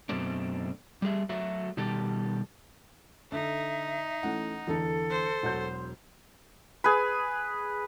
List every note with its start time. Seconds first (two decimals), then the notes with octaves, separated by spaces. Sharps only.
0.09 F#2 B2 A3 C4 D4
1.02 G3 A3 G#4 E5
1.29 F#3 A3 F#4 E5
1.77 B2 D#3 G3 G4 A4
3.32 D3 D#4 A4 E5
4.23 E3 A3 C#4 F#5
4.67 E2 D3 E3 A4
5.11 C5
5.43 E1 F#3 F#5 C6 G6
6.84 G#4 B4